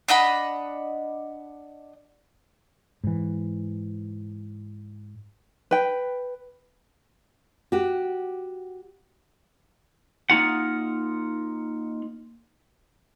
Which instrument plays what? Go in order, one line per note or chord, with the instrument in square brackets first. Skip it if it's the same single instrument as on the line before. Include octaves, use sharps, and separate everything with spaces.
[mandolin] D4 D#5 F#5 B5
[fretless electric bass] G#2 E3
[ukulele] B4 G5
[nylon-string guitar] F#4 G4
[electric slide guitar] A#3 D#4 F4 F#5